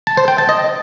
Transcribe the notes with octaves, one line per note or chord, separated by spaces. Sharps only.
A5
C5
G5
A5
D#5